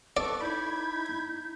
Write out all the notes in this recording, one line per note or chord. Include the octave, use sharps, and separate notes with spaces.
A4 B4 D5 C#6 D6
D#4 E4 B5 G6 G#6